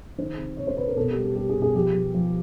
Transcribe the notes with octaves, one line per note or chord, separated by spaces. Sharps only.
D#3 C5
C3
C3 C#5
C5
C3 B4
A#4
B2 A4
G4
G3
G4
G3 G4
G#4
B2
G#4
F3 G4
F3
F3